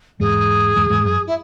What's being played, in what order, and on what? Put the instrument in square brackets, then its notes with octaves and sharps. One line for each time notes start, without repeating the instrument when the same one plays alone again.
[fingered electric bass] E2 G#2 [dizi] G#4
[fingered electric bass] E2 G#2
E2 G#2
F#2
[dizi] E4